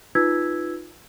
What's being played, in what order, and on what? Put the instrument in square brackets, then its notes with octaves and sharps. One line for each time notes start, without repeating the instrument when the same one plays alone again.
[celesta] D#4 F4 B4 E6 G#6 B6